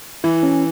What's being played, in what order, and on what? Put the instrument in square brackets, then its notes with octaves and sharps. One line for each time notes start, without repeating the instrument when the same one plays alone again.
[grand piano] E3 [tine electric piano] E4
[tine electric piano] C#4